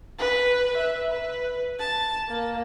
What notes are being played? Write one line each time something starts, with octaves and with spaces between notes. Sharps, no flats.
B4
E5
B4
A5
A#3